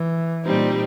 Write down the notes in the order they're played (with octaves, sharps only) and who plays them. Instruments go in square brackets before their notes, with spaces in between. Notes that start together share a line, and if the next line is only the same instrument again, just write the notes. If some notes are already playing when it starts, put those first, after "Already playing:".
Already playing: [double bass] E3
[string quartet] A#2 G3 C4 D#4